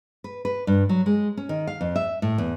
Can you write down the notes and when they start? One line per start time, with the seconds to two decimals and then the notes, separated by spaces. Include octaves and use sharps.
0.24 B4
0.45 B4
0.67 G2
0.89 F#3
1.06 G#3
1.37 C#4
1.49 D#3
1.67 F5
1.81 F2
1.96 E5
2.22 A2
2.38 E2